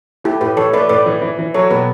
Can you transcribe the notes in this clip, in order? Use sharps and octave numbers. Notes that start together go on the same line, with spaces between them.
A3 E4 G4
A2 G4 B4
E3 A4 C#5
A3 B4 D5
A2 B4 D5
E3
E3
E3
F#3 A4 C#5
B2 G4 B4